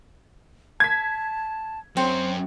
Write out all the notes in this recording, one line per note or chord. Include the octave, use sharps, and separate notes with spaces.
A5 G#6 B6
F#2 C4 C#5